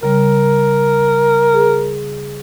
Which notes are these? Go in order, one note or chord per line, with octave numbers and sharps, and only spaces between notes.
C#3 G3 A#4
G#4